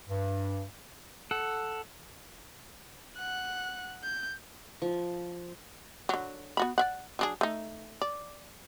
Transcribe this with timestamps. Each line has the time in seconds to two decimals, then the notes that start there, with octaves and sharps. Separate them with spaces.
0.08 G2
1.31 A4 F#5
3.17 F#5 F#6
4.03 G6
4.82 F3
6.09 D3 F#3
6.57 B3 F#4 B5
6.78 D5 E5 F#5
7.19 F#3 D4 G#4
7.41 A3 D#4
8.02 D5